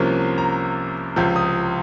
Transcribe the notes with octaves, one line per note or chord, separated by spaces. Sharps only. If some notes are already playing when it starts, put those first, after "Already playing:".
Already playing: C2 C3 F3 A#3 C#4
A#5
C#2 C3 F3
D#6